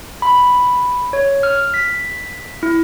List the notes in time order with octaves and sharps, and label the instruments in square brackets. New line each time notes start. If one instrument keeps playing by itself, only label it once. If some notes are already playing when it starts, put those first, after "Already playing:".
[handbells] B5
C#5
F6
B6
E4